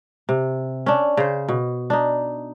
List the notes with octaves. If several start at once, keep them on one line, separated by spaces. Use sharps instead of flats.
C3
C#4 D4
C#3 C5
B2
D4 D#4